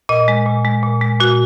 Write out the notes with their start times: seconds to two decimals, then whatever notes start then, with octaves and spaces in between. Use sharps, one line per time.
0.09 A#2 D#5
0.28 G#3
0.46 A#2
0.65 G#3
0.83 A#2
1.01 G#3
1.20 A#2 F#4